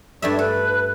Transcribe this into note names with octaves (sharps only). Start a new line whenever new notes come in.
G2 A3 D5 E5
A4 B4